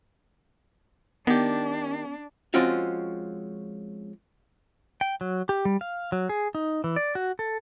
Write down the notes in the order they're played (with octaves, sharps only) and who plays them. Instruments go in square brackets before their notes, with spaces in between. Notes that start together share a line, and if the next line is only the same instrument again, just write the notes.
[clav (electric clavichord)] D#3 G4 [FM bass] B3 [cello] D4
[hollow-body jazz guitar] F3 G#3 C4 C#4 F4 F#4
[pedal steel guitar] G5
F#3
G4
G3
F5
F#3
G#4
D#4
E3
D5
F#4
A4